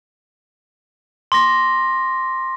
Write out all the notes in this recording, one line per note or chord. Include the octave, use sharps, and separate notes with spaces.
C6 D6 A#6